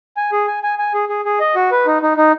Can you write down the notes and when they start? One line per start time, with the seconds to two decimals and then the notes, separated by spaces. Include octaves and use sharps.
0.17 G#5
0.32 G#4
0.47 G#5
0.63 G#5
0.79 G#5
0.94 G#4
1.09 G#4
1.25 G#4
1.40 D#5
1.55 F#4
1.71 B4
1.86 D#4
2.02 D#4
2.17 D#4